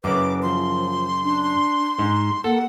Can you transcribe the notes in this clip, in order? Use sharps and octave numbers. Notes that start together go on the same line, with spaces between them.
F#2 C#3 B4 D6
F3 C6
D4
G#2
A#3 A4 F#5